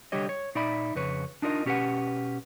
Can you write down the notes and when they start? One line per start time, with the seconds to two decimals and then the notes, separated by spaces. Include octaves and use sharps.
0.12 C2 D3 G3 G4 C#5 D#5
0.29 C#5
0.55 A#2 D#4 D5 E5 B5
0.95 F2 C#3 B4 C#5
1.42 D4 D#4 F4 A#4 D5 D#5
1.65 B2 C#4 G4 G#4 B4 F#5